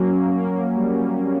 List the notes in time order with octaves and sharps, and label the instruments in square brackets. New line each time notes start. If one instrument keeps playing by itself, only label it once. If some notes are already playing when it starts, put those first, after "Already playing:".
Already playing: [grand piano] F#3 [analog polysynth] A#3 C#4
[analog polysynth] A#3
G3
C#4